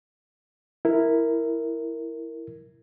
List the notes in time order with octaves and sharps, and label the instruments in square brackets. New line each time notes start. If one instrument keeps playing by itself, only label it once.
[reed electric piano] E4 A#4